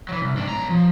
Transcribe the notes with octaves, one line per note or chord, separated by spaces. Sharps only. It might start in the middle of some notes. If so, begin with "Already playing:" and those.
E3 F#3
C2
G#2 D4
B1 A#5
F3